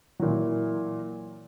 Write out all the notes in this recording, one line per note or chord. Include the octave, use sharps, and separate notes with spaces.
A#2 E3 F#3